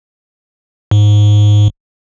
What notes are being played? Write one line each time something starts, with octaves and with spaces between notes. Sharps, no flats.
G#2